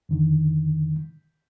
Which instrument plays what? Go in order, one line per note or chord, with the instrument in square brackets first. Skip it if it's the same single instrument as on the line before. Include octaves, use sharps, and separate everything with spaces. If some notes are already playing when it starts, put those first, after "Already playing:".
[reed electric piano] F2 D3 D#3